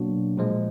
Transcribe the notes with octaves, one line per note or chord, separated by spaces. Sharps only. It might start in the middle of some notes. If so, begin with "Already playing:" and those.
Already playing: B2 F#3 A#3 D4 F#4
A#2 F3 G#3